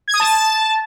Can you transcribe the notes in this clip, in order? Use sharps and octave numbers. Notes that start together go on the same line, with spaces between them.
G#6
D#6
A5